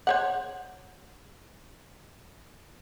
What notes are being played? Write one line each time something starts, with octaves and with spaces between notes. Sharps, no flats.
C5 C#5 F#5